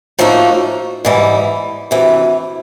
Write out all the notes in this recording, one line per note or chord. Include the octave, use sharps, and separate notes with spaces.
A2 F3 A#3 D#4 F#4
G#2 E3 G3
D2 C3 E3